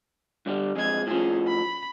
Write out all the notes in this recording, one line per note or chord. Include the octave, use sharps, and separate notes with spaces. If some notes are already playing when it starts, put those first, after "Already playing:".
G2 D3 G3
F2 G#3 G#4 G#6
A2 F3 C#4 G#4
B5